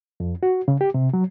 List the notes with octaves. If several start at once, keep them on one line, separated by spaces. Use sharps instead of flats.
F2
F#4
C#3
G4
C3
F#3